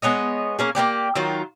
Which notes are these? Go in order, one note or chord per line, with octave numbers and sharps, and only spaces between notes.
G#3 B3 C#5 D#5
A#3 C#4 G#4
A#3 B3 G4 D5
D#3 F#3 F4